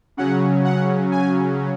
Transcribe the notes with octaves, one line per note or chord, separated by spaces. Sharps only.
C#3 F#3 C#4 F#5
F#5
G#5